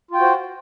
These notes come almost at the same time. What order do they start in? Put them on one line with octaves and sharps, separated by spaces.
F4 G5 F#4 C5